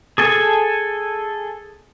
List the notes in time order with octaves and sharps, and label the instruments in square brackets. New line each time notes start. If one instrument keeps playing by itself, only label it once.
[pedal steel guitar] G#4 A4 G#5